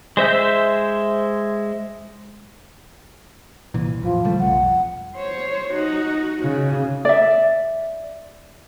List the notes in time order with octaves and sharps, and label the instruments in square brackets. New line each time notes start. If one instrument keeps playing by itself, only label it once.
[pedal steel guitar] G#3 C5 E5 G6
[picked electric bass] C2 A#2 E3
[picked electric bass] A1 E2 [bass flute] F3
[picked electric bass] C#3 G3 A3
[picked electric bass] B1 F2 [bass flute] F#5
[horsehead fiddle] C5 C#5
D#4 F#4
[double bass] C#3 [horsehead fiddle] F#4
[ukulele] D5 E5